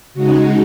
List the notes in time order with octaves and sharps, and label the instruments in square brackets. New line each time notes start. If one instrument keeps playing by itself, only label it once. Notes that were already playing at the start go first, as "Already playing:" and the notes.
[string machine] C#3 G#3 D#4 F#4